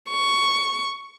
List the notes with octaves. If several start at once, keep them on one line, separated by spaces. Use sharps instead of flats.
C#6